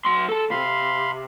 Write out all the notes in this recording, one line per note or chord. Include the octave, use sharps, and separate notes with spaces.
F#3 C6
A4 A5
C#2 C3 F5 B5 C6